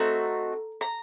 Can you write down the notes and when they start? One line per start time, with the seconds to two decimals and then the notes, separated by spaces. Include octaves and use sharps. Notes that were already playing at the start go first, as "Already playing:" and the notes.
Already playing: A3 C4 D#4 F#4 A#5
0.81 A#5